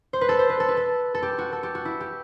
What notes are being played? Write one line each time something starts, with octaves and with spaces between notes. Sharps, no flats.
C5
B4
A4
C5
B4
A4
B4
A4
A4
G4
F#4
A4
G4
F#4
E4
G4